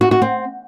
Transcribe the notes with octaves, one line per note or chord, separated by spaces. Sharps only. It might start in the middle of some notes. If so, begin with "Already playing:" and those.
F#4
F#4
C4